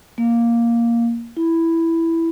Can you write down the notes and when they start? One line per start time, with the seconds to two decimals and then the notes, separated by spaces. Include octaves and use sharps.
0.18 A#3
1.37 E4